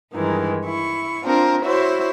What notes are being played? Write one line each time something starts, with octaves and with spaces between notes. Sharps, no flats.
G2 D#3 E3 G#3
E4 C#6
C4 D4 F4 A#4 C5
E4 F#4 C5 C#5 E5